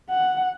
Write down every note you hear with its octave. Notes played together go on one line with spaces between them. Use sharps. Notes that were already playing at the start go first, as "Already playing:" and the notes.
F#5